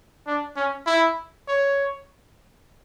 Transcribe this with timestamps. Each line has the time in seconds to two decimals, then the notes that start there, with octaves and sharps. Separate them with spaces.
0.27 D4
0.56 C#4
0.87 E4
1.48 C#5